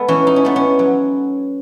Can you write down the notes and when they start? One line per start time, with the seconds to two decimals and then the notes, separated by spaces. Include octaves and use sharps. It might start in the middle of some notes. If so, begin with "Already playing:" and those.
Already playing: G#3 B3 A4 B4
0.08 E3 C#4
0.27 D#4
0.36 C#4
0.45 A3 B3
0.56 C#4
0.79 F#3